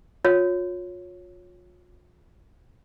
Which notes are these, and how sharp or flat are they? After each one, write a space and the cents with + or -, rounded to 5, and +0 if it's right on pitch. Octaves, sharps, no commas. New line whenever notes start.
F4 +40 C#5 +0